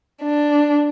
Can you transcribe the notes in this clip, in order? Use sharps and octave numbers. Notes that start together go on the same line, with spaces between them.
D4